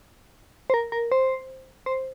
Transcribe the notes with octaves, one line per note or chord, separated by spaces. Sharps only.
C5
A#4
A#4
C5
C5